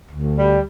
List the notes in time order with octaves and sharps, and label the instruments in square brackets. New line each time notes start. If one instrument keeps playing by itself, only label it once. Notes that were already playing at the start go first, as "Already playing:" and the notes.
[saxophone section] D2
G3